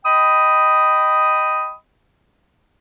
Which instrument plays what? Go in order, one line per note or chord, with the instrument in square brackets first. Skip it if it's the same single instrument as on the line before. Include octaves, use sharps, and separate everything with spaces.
[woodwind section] D#5 G5 B5 D#6